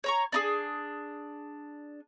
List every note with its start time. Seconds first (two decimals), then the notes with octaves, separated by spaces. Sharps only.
0.04 C#5 A#5 C#6
0.32 D4 D#4 G#4